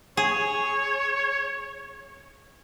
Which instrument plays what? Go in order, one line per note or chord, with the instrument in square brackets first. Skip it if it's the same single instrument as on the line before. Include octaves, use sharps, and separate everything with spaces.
[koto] G#4 [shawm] C#5